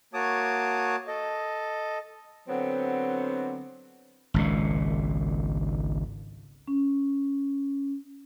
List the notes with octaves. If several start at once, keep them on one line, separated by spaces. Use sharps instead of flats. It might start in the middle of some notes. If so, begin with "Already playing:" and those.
A#3 F#4 C#5 A5 D6 D#6
A4 D#5
D3 F#3 B3 C4
G#1 C#2 A#2
C#4